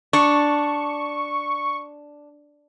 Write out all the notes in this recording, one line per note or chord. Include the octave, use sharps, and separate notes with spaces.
D4 C#6